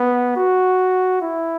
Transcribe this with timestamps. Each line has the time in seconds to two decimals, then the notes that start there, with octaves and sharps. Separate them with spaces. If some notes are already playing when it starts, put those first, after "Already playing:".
Already playing: B3
0.36 F#4
1.22 E4